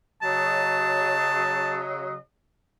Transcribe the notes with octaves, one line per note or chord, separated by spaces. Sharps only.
C#3 F#3 D#5 A5